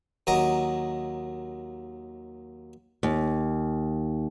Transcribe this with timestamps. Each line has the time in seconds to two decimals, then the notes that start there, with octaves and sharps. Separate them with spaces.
0.27 D#2 F#3 D#5 A#5
3.03 D#2